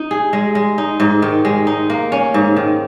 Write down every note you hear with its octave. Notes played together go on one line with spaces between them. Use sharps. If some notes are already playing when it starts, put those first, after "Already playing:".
Already playing: D#4
G#4
G#3
G#3
D#4
G#2
D#3
G#3
D#4
A#3
C#4
G#2
D#3